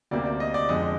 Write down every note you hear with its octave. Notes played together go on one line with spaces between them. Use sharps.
D2 C3 G3 A#3 D5
D5
D#5
D5
F2 D3 G#3 D#5